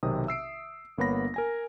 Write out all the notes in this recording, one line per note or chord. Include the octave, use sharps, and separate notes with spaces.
B1 C3 D#3 C4 D#6
E5 E6 C7 D7
G1 A#3 B3 C#5 B5 A#6
A#4 G#5 A#6